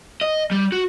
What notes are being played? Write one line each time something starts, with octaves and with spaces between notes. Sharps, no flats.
D#5
G3
F#4